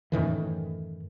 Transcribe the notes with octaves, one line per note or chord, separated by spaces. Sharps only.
F#2 A2 D#3 E3